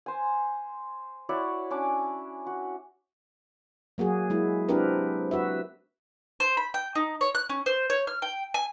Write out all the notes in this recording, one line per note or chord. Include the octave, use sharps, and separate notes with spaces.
C5 G#5
E4 F#4 C#5 D5
C#4 D4 D5 D6
F#4
F#3 A#3 F#4 G#4
G#3 E4
C4 D4 E4 G4 A#4 B4
F#4 B4 E5
C5
B5
G5
D#4
C#5
F#6
C#4
C5
C#5
F6
G5
G#5